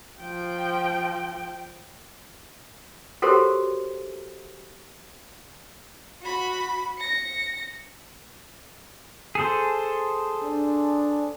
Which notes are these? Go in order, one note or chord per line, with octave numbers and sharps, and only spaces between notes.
F3 G5
F#4 G4 A4 A#4 C5 C#5
F#4 B5
A#6 C#7
G#4 A4 C5
D4